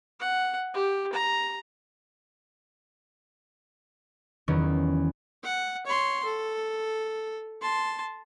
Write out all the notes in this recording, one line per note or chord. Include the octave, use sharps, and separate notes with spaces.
F#5
G4
A#5
E2 D#3 F#3 B3 C#4
F#5
C#5 C6
A4
A5 C6